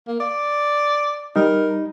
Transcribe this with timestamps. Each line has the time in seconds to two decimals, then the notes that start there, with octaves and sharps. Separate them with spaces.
0.07 A#3
0.20 D5
1.36 G3 D#4 A#4